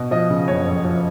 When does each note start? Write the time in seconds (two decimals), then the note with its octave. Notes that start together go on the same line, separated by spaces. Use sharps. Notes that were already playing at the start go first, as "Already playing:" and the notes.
Already playing: B2
0.11 F3 D#5
0.30 C#3
0.48 F#1 C#5
0.66 F2
0.84 F3